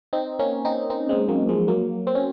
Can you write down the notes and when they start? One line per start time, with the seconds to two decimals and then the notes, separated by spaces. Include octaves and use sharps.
0.13 C4 D#4
0.39 A#3 C#4
0.65 C4 D#4
0.90 C4 D#4
1.09 G#3 C4
1.29 F#3 A#3
1.49 F3 G#3
1.68 F#3 A#3
2.07 C4
2.15 C#4